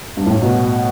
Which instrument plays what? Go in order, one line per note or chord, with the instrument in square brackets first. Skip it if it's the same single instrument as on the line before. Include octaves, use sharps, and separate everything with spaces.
[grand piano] G2
A2
B2